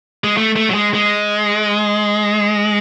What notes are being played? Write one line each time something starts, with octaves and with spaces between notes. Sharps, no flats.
G#3
A3
A3
F#3
G#3
G#3